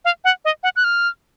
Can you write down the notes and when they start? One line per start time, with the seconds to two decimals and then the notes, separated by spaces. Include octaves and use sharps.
0.05 F5
0.24 F#5
0.45 D#5
0.63 F#5
0.76 F#6
0.84 F6